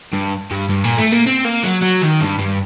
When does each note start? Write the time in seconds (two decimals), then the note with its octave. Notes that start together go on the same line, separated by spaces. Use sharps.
0.13 G2
0.51 G2
0.69 G2
0.84 A#2
0.98 A3
1.12 A#3
1.26 C4
1.45 A#3
1.63 F#3
1.82 F#3
2.02 D#3
2.21 G2
2.39 G2